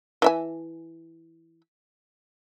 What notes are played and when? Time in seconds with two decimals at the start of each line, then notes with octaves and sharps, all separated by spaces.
0.22 E3 E5 G#5